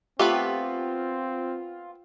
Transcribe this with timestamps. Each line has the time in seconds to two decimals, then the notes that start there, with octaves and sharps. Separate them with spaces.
0.19 A3 B3 C4 F4 G4 B4